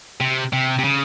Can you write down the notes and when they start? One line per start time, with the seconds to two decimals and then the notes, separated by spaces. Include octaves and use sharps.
0.20 C3
0.53 C3
0.79 C3
0.84 C#3